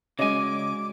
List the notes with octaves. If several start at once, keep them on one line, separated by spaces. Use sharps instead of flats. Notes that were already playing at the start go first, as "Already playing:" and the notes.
C#3 G#3 C#4 F#4 D5 D#5 G#5 D6